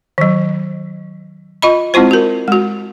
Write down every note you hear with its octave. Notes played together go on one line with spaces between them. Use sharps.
D#3 F#3
F4 D#5 B5
G#3 C4 E4 F4 C5
F#4 A#4
G#3 F#4